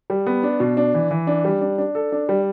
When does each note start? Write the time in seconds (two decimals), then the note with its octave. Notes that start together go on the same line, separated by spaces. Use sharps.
0.10 G3
0.27 B3
0.43 D4
0.60 B2
0.77 D4
0.94 E3
1.11 E3
1.27 D4
1.45 G3
1.61 D4
1.78 D4
1.95 A4
2.12 D4
2.29 G3